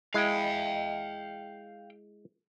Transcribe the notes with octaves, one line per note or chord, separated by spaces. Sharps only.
G#3 E4 F5 G5